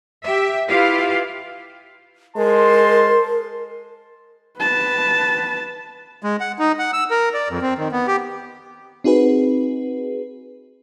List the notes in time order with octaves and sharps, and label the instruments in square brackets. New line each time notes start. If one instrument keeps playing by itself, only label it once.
[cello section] G4 E5
E4 F4 G4 B4 F5
[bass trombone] G#3 [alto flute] A#4 [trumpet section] C5 A5 C6
[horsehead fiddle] B4 A5
[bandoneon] G#3
F#5
D#4
F#5
E6
A#4
D5
F2
C4
D#3
B3
G4
[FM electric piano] C4 D#4 F#4 G#4 B4